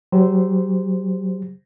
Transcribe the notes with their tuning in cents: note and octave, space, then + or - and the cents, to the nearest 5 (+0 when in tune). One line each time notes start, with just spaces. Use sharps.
F#3 +30 G4 +35 C5 -10